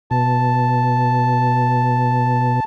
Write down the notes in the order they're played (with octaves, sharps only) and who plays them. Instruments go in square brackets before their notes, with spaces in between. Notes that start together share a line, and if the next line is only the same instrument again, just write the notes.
[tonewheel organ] B2 [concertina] A5